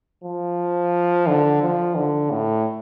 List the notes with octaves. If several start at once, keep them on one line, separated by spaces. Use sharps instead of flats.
F3
D3
F3
D3
A2